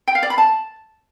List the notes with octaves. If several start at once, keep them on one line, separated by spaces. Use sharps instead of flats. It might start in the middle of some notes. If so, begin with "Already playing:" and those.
G5
F5
D5
B5
A5